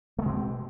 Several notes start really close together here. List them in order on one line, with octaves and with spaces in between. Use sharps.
A3 G#3 B2 C4